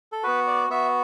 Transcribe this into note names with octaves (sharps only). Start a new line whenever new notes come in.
A4
B3 F#4 B4
D5
B3 F#4 E5